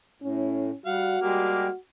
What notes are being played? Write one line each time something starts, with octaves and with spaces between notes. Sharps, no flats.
A2 C#4
G3 F#4 F5 F#5
G3 G#3 A#3 G4 F6